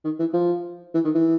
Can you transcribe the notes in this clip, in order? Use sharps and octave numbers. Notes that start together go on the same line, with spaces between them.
D#3
E3
F3
E3
D#3
E3